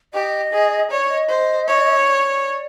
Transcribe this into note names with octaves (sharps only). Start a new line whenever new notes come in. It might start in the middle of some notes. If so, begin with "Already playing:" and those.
G4 D#5
G#4
C#5 D5
D#5
C5
C#5
D5